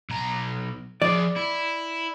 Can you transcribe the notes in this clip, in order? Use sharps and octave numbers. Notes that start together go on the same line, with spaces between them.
B1 A#5
F3 G#4 D5
E4